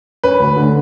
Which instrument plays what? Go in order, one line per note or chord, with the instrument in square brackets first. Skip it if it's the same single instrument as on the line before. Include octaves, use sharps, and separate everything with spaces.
[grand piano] C#4 B4
D2
D3